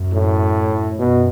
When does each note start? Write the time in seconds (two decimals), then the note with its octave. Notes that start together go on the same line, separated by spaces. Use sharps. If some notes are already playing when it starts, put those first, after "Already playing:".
Already playing: F#2
0.12 A2
0.99 F#2 B2